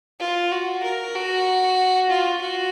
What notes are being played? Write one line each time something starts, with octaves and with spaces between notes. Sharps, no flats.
F4
F#4
A#4
F#4
F4
F#4